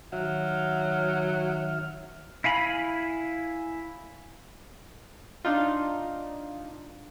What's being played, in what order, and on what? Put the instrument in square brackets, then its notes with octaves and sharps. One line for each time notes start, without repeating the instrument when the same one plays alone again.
[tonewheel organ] D#3 E5 F6 [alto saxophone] F#3
[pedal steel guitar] E4 F5 G#5 B5
[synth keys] D4 D#4 F4